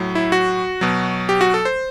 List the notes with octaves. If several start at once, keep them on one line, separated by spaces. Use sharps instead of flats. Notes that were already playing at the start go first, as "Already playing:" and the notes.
Already playing: A2 F#3
E4
F#4
B2 F#3
G4
F#4
A4
C5